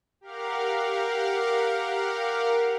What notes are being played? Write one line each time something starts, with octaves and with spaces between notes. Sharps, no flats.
G4 A#4 F5 F#5